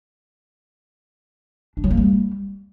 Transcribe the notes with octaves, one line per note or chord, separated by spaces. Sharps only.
D4
F#3
A#3
G3